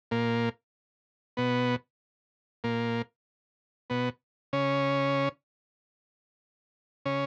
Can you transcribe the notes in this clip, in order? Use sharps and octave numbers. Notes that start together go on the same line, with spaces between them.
A#2 A#3
B2 B3
A#2 A#3
B2 B3
C#3 C#4
C#3 C#4